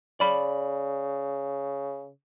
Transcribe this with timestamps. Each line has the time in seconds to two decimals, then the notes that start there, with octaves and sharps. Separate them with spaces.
0.20 C#3 D5 B5